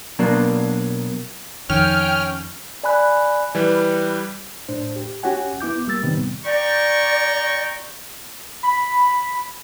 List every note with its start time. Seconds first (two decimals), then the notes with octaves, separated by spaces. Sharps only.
0.19 B2 F#3 A#3 D4
1.70 F2 D#3 C#4 G5 F6
2.84 D5 G#5 B5 F#6
3.55 E3 G3 B4
4.69 A2 D4 C5
4.96 G4
5.23 C#4 F#4 G4 C#5 F#5 G#5
5.61 B3 E4 D6 G6
5.87 G3 A#3 E6 A6
6.02 A2 C3 D#3 G3 B3 C4
6.45 D5 G5 A#5 C#6
8.63 B5